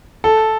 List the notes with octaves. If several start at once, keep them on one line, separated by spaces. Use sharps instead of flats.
A4